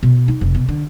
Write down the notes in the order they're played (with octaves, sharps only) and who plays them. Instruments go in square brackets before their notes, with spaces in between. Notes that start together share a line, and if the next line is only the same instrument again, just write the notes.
[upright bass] B2
D#4
F1
B2
D3